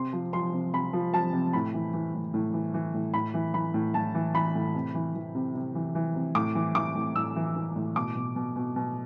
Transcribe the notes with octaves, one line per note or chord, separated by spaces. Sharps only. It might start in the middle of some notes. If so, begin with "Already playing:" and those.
Already playing: C3 C6
F3
F3 C6
C3
C3 B5
F3
F3 A5
C3
A2 B5
E3
E3
A2
A2
E3
E3
A2
A2 B5
E3
E3 B5
A2
A2 A5
E3
E3 B5
A2
C3
E3
E3
C3
C3
E3
E3
C3
A2 D6
E3
E3 D6
A2
A2 E6
E3
E3
A2
B2 D6
B2
B2
B2
B2